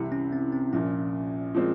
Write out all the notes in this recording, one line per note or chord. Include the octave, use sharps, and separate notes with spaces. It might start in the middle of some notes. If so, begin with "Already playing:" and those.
Already playing: C2 C3 E3 E4
C#4
C4
C4
A#1 A#2 F3 C#4
A#2 F3 G#3 C4